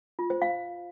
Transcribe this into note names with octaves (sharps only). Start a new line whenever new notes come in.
F4
C5
F5